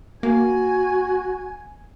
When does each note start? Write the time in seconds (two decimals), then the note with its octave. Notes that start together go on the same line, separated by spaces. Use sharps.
0.23 A#3 F#4 G#5